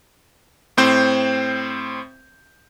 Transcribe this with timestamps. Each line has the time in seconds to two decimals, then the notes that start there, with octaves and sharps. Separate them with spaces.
0.77 A2 C4 C5 G6